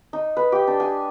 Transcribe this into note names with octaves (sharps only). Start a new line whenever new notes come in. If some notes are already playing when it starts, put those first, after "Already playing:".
D#4
B4
G4
D4
G#5